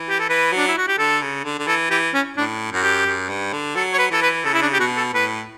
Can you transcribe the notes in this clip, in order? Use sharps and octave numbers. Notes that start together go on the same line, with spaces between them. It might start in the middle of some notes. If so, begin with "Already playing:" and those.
Already playing: E3
G4
A4
E3 B4
F#3 D4
E4
F#4
G4
D3 A4
C#3
D3
D3
E3 A4
E3 G4
C#4
A2 D4
F#2 F#4
G4
F#2
G2
D3
F#3 A4
C#5
B4
E3 A4
B4
C#3 A4
E4
D4
G4
B2 F#4
A4
A2 B4